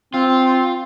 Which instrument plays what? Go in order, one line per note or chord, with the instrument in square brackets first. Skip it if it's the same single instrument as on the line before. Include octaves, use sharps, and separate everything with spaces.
[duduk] C4 [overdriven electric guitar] F4